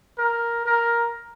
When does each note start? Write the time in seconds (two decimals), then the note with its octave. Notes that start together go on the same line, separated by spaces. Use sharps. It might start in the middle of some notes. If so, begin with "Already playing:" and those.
0.18 A#4
0.66 A#4